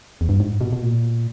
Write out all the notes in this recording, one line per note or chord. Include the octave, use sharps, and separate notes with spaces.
E2
G2
G#2
B2
B2
A#2